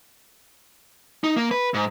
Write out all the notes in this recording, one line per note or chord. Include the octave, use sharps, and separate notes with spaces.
D#4
A#3
B4
G#2